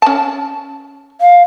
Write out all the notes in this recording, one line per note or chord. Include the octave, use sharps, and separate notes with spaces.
C#4 A5
F5